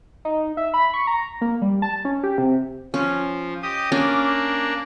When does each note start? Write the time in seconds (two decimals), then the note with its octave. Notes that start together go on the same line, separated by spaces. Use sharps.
0.25 D#4
0.57 E5
0.74 B5
0.94 C#6
1.07 A#5
1.41 A#3
1.62 G3
1.82 A5
2.05 C#4
2.23 G4
2.38 C3
2.94 F3 C#4
3.62 G4 D#5 D#6
3.92 A#3 C#4 D4